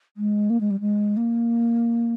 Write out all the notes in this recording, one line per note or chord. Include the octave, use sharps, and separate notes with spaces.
G#3
A#3
G#3
G3
G#3
A#3